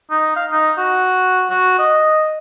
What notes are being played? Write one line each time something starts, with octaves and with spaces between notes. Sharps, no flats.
D#4
F5
D#4
F#4
F#4
D#5